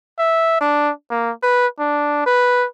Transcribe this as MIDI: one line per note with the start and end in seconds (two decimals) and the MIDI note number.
0.19 0.61 76
0.61 0.91 62
1.10 1.31 58
1.43 1.67 71
1.79 2.23 62
2.26 2.66 71